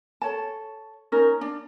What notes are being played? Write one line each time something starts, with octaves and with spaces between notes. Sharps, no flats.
A4 C#5 A5
C#4 D#4 A#4
D4